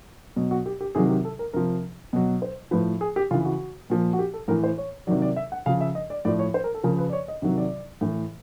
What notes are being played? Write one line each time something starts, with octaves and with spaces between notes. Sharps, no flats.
B2 F#3
F#4
G4
G4
C3 D#3 F#3 G#4
G4
A4
A#4
C3 F3 A#4
B2 F#3
C5
A2 F3 B4
G#4
G4
C#3 E3 F4
F#4
A#2 F3
F#4
G4
A4
A2 E3 A#4
C5
C#5
C3 D#3 F#3 D5
D5
E5
F#5
C#3 F3 F5
E5
D#5
D5
A2 F3 D5
C#5
C5
A#4
A4
C#3 F3 A#4
B4
D5
C#5
D#5
C3 D#3 F#3
D5
A2 E3